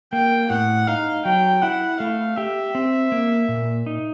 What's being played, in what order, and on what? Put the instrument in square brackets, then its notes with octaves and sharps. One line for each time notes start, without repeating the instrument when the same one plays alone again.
[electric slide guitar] A#3 [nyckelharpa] G5
[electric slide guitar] A2 [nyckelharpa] F#5
[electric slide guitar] D#4 [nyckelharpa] F5
[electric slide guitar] F#3 [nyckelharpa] G5
[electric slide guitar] E4 [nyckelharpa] F#5
[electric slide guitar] A3 [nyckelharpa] F5
[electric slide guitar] G4 [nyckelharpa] E5
[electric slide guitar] C4
A#3
A#2
D#4